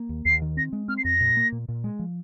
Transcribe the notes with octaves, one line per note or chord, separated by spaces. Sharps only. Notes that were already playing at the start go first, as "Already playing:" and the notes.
Already playing: A#3
D#2
D#2 C7
D#3
C4 A#6
G#3
C4 F6
C7
F2 A#6
A#2
A#3
A#2
A#2
G#3
F3